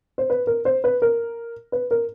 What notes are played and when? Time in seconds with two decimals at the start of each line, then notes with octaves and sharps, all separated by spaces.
0.18 C5
0.30 B4
0.47 A#4
0.65 C5
0.84 B4
1.02 A#4
1.72 B4
1.91 A#4